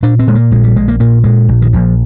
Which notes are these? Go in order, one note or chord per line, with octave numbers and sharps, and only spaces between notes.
A#2 D4
C4
A#2 G#3
A#3
A#1 G#3
G3
A#1 G#3
A#3
A#2 A#3
A#2 G#3
A#1
D#3
A#1 F3